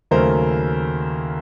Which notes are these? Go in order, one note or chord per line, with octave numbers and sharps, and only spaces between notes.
D#2 C#3 F#3 A3 A#4 C5